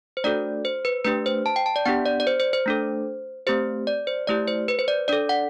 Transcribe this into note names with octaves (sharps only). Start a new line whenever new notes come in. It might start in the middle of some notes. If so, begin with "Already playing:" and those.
C5
A3 D4 F#4 A4 D5
C5
B4
A3 D4 G4 B4
C5
A5
G5
A5
D5
B3 D4 G4 F#5
D5
D5
C5
C5
C5
A3 D4 A4
A3 C4 G4 C5
D5
C5
A3 E4 G4 D5
C5
B4
C5
D5
D4 A4 D5
F#5